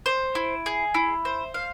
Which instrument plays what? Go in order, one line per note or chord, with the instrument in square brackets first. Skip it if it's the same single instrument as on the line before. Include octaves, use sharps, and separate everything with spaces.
[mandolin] C5
E4
G#4
E4
C5
F5